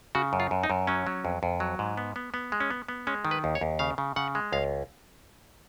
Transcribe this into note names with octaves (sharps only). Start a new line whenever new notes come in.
C#3 F#4
F#2
F4
F#2
D#4
F#2
F#3 C#4
F#3
F2
F2
F#3
G#2
B3
B3
B3
G#3
C#4
B3
B3
G#3 C#4
D#3
B4
D#2
C#5
D#2
C#3 F5
C#3
C#3 F#5
G#3
C#2 F5